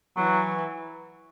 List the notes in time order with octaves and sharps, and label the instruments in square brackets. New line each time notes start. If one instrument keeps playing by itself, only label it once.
[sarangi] E3 [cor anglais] F#3